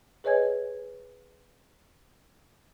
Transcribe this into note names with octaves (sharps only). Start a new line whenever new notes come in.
G#4 B4 C#5 D#5 G#5 G#6